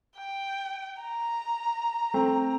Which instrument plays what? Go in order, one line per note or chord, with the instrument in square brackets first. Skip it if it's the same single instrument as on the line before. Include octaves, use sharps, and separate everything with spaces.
[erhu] G5
A#5
[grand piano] A3 C4